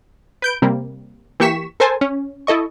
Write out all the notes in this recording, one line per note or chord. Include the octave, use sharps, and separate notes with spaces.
B4 G6 D7
C3 G3 A#3
E3 A#3 G4 C#6 B6 E7
A4 A#4 C5 G#5 A5
C#4
E4 A4 D#5 C#6